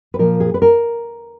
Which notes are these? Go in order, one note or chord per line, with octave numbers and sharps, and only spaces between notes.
B4
A#2 F3 A#4
G#4
B4
A#4